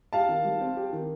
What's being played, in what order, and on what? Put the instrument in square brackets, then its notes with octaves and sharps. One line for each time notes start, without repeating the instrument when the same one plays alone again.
[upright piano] G4 [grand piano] F5 A5
[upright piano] D#3
G3
C4
G4
D#3